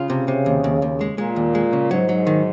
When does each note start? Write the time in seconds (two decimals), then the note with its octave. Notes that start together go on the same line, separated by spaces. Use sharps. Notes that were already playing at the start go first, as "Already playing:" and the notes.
Already playing: C#3 F4
0.10 C3
0.28 C3
0.46 D#2
0.64 D#2
0.82 D#2
1.01 G#3
1.18 A#2 G#3
1.36 D#2
1.55 G#3
1.73 C#3
1.90 G#2 F#3
2.09 F#3
2.27 D#3